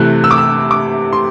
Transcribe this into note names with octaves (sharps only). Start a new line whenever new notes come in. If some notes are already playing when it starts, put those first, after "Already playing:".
Already playing: C3 E3 A3 F#6
E6
D6
E6
D6
C6